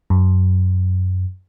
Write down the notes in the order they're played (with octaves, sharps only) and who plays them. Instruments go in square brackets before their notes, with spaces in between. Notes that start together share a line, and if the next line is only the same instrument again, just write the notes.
[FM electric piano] F#2